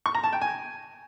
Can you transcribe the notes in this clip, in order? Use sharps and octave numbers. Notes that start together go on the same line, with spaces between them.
C#6
A#5
A5
G5
G#5